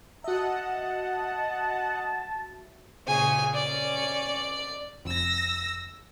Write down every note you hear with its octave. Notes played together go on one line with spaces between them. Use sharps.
F#4 D#5 E5 F#5 A5
A#2 C#3 G#4 G#5
C#4 D5
F1 E6 A#6